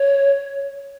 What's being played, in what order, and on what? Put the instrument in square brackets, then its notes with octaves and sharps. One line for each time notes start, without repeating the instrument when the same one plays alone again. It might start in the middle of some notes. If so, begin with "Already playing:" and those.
Already playing: [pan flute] C#5